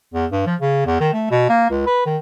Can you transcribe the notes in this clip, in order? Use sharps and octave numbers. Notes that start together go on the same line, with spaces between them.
E2
G2
F3
C#3
E2
D#3
A3
B2
A#3
C#2
B4
D#3